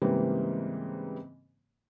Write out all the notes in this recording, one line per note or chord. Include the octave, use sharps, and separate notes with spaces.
G#2 C#3 E3 G3 A#3 C4